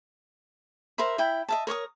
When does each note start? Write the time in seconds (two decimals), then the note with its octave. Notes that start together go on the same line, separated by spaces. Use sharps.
0.98 A#4 C5 E5 B5
1.18 E4 E5 G5 B5
1.49 D#5 E5 A5
1.67 A#4 C#5 C#6 D#6